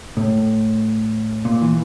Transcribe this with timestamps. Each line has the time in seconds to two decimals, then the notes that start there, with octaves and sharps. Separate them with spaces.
0.17 A2
1.45 A#2
1.62 E3